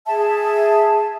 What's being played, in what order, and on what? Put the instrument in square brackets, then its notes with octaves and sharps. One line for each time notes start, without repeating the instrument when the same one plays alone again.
[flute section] G#4 E5 A5